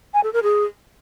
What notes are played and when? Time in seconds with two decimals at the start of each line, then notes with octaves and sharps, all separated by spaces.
0.14 G#5
0.24 A4
0.33 A#4
0.43 G#4